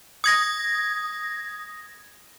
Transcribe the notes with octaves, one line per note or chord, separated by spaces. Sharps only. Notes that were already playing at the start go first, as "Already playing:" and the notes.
D#6 G#6 A#6